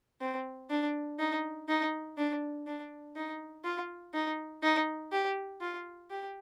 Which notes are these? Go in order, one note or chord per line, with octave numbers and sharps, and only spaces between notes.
C4
D4
D#4
D#4
D4
D4
D#4
F4
D#4
D#4
G4
F4
G4